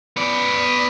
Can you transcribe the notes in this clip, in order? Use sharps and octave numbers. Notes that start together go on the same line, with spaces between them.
B3 D5